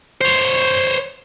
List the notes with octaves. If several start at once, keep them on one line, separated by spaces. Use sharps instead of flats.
C5 C#5